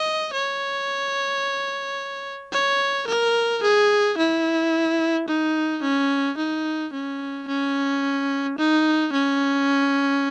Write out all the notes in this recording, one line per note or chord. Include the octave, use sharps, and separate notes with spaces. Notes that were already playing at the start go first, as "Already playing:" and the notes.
Already playing: D#5
C#5
C#5
A#4
G#4
E4
D#4
C#4
D#4
C#4
C#4
D#4
C#4